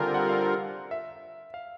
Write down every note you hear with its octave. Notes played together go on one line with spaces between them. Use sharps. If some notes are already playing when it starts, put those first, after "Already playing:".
Already playing: D3 G3 C4 F4 A#4 G#5
F#5
F5
E5
F5